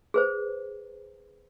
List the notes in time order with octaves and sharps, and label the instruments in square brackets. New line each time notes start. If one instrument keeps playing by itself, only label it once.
[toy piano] G#4 B4 C5